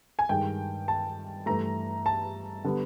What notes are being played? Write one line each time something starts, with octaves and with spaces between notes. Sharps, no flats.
G#5
G2 D#3 G#3 G5
A5
G2 E3 A3 A#5
A5
D3 G3 B3